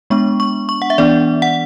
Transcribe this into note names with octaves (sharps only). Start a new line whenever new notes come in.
G#3 B3 D4 C#6
C#6
C#6
F#5
E5
E3 B3 D4 D5
F#5